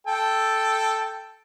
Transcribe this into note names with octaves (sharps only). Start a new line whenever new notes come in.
A4 G5